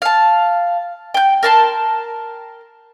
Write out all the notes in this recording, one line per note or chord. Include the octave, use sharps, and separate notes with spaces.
F5 A5
G5 G6
A#4 A5 C6